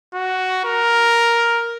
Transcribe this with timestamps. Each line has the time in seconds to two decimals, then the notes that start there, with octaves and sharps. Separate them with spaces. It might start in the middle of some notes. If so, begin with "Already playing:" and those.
0.14 F#4
0.65 A#4